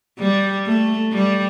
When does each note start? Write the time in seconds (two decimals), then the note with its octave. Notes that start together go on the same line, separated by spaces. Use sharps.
0.19 G3
0.66 A3
1.13 G3